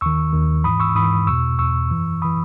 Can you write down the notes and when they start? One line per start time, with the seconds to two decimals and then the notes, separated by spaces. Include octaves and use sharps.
0.01 D#2 D#3 C#6 E6
0.33 D#2 D#3
0.64 G#2 E3 B5 D#6
0.80 C#6 E6
0.95 G#2 E3 B5 D#6
1.27 E2 B2 C#6 E6
1.59 E2 B2 C#6 E6
1.91 F#2 E3
2.22 E3 B5 D#6